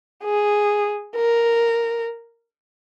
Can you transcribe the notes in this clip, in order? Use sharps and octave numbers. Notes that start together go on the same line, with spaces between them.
G#4
A#4